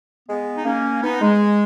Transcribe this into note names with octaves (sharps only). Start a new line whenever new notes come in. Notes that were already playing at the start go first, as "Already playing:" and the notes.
G#3 B3
D#4
A#3 C#4
B3 D#4
G#3